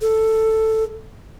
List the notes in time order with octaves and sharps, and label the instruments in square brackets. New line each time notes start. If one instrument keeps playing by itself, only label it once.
[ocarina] A4